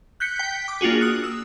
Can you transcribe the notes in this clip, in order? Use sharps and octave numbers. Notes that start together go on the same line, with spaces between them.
F#6 G6 B6 C#7
G5 B6
D6
A#3 D4 F4 F#4 G#4
D#6 F#6
E6